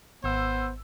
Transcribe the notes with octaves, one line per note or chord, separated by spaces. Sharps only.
G#1 B3 C5 E6